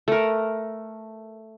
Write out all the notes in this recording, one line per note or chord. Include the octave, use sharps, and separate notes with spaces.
A3 A#4